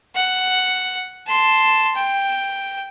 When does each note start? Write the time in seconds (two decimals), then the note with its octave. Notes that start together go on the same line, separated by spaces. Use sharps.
0.15 F#5
1.27 A5 C6
1.96 G5